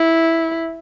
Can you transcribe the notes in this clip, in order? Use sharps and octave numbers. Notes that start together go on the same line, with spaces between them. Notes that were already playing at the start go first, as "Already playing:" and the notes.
Already playing: E4